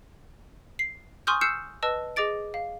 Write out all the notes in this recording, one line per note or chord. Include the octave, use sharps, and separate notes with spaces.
C7
G#5 C6 C#6 D#6 F6 G6
E6 F6 G6 C7 C#7 E7
B4 D#5 A5 E6
G#4 D#5 D6 A6 D7
F5